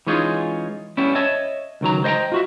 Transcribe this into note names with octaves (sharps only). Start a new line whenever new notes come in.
E3 G#3 C#4 D#4 F4 G#4
G3 B3 C#4 E4
C#5 D#5 E5 A5
C#2 D#3 F#3 A#5
C5 D#5 F5 G5 A#5
F4 F#4 E5